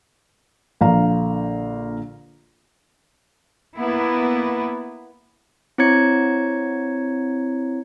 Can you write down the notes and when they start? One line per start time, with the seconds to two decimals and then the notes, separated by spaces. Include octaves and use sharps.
0.81 A#1 D3 F5 A#5
3.77 A#3 B3 E4
5.78 C4 E4 C#5 A#5 G#6 C#7